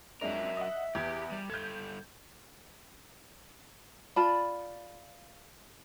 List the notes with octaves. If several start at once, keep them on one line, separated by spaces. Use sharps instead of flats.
F2 F#3 G#3 D4 A#4 E5
D#5 F#5
E2 B3 G4 G#6
G3
G2 C#3 A4 G6 G#6
F4 D5 A5 B5